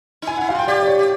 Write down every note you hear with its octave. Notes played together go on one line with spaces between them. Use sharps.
D#4
E4 G#5
E4 F#5
F#4 F5
F4 G5
G4 D5
D5
C#5
G4